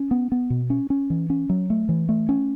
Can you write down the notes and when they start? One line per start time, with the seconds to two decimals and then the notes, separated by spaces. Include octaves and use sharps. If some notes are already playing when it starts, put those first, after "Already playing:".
Already playing: C#4
0.11 B3
0.32 B3
0.50 B2
0.70 C#4
0.90 C#4
1.10 E3
1.30 C#4
1.49 F#3
1.70 A3
1.89 E3
2.09 A3
2.29 C#4